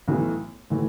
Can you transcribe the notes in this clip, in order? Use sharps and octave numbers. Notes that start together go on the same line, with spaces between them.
B1 A2 E3 A3
A2 E3 A3